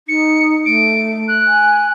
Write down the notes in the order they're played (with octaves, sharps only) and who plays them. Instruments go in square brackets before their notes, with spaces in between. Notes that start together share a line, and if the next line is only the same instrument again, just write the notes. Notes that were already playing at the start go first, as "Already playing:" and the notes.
[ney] D#4 [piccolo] C#7
[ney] A3 [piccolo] D7
[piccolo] F#6
[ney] G#5